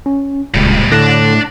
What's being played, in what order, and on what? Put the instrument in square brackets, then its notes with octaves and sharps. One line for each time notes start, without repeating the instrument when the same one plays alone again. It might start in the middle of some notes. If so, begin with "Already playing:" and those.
[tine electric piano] C#4
[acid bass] D1 [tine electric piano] C#2 [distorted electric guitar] A#2 G3
[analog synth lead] A2 [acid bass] D3 [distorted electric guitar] D4 A5 [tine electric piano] F#6 A#6